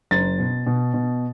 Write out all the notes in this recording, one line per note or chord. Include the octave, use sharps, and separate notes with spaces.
F#1 A6
B2
B2
B2